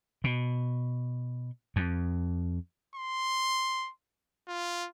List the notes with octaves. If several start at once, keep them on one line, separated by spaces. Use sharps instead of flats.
B2
F2
C6
F4